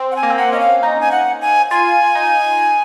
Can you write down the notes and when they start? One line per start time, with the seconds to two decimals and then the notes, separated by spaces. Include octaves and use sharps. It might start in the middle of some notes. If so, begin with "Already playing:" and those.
Already playing: C4
0.11 F#5
0.16 G#5
0.23 A#3
0.30 C4
0.38 A#3 F#5
0.52 C#4 D#5
0.60 F5
0.82 D#4 D#5
1.01 G#5
1.12 F#5
1.41 G#5
1.71 F4 G#5
2.15 D#4